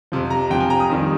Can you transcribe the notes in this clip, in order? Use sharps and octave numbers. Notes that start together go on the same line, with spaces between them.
F2 C3 F3
A#5
F2 C3 F3 G5
G#5
A#5
D#6
F2 D#3 G3